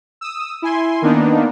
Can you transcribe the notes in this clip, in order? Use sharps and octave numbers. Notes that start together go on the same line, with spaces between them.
D#6 E6
E4 G#5 C6
D#3 A#3 B3 D4 D#4